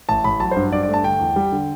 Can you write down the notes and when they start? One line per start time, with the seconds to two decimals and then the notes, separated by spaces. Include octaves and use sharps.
0.09 A1 A5
0.24 A1 B5
0.40 F#3 A5
0.51 G2 C5
0.72 G2 D5
0.83 D5
0.88 A3
0.94 A5
1.04 D3 G5
1.20 E2
1.36 G3
1.52 D3